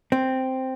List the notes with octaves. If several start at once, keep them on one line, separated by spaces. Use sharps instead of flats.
C4